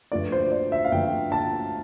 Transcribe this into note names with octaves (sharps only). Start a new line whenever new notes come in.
G2 F3 A3 D5
C5
D5
E5
F5
G2 F3 A3 G5
A5